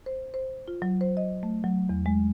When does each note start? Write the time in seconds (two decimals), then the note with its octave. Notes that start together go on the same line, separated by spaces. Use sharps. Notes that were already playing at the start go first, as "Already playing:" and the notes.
0.06 C5
0.34 C5
0.68 F4
0.82 F#3
1.01 C5
1.17 D#5
1.43 A3
1.64 F#3
1.89 E2
2.06 G#3